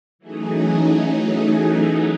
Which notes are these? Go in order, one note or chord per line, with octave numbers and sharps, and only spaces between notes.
E3 F#3 A3 C#4 D#4 G#4